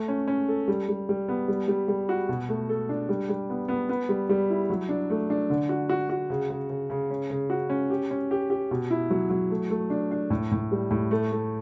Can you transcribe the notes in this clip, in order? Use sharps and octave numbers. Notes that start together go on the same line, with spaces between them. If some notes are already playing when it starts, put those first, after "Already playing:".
Already playing: A3
C#4
C#4
A4
G3
G3
G3
B3
G3
G3
G3
F#4
B2
A3
A4
D4
G3
G3
B3
B3
B3
G3
G3
E4
F#3
D4
A3
D4
D3
F#4
F#4
F#4
C#3
C#3
C#3
C#3
C#4
C#3
F#4
C#4
G4
C#4
G4
G4
B2
E4
F#3
F#3
A3
A3
D4
D4
A2
A2
G3
A2
A3
A3